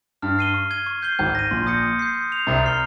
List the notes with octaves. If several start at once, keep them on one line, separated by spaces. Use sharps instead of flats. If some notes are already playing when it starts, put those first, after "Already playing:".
G2 F6
C7 D#7 G7
C#6
G#6 D#7 G7
C#6
G6 C7 G7
G#1 G#2 G6
A#6 D#7
A#1 A#2 C6
D#6 G6 A#6 C#7
D#6
G6 C7
D#6
G6 C7 F7
C2 C3 A#5
C#6 F6 C7 G7